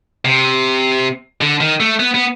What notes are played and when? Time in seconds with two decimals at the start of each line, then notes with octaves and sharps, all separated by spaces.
0.25 C3
1.41 D3
1.61 D#3
1.80 A3
1.99 B3
2.14 B3